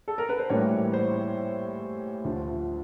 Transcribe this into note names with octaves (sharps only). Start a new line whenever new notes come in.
A4
A#4
B4
C5
A2 E3 G3 A#3 C#5
C5
D2 D3 F3